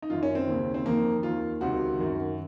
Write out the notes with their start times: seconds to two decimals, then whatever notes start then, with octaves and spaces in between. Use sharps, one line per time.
0.02 D#4
0.10 F#2 D#3 F4
0.23 C#4
0.35 C4
0.48 D#2 C#3
0.74 C4
0.86 F2 D#3 A#3
1.23 D#2 D#3 F4
1.61 C#2 C3 D#3 F#4
1.99 F#2 D#3